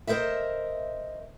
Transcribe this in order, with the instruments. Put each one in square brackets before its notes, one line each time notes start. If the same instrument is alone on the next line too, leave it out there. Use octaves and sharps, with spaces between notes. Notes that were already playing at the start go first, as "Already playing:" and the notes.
[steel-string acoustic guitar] A#4 C5 D#5 E5